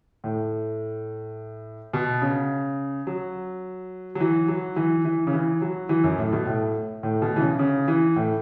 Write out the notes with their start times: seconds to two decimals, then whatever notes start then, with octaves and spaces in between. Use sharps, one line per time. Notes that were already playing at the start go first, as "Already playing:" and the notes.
0.24 A2
1.93 B2
2.22 C#3
3.07 F#3
4.15 F#3
4.20 E3
4.48 F#3
4.76 E3
5.04 E3
5.27 C#3
5.33 E3
5.62 F#3
5.89 E3
6.04 F#2
6.18 A2
6.32 B2
6.46 A2
7.03 A2
7.22 B2
7.36 E3
7.41 C#3
7.59 C#3
7.88 E3
8.16 A2